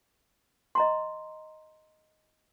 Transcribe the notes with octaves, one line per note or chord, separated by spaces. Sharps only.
D#5 A#5 C6